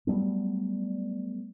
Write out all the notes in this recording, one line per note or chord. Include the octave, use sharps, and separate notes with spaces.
F#3 G3 A3 B3